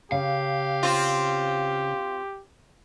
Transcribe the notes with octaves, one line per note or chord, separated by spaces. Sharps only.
C#3 G4 F5
C4 F4